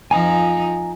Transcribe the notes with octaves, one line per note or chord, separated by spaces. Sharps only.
F2 F3 D#4 G#5 A#5 D#6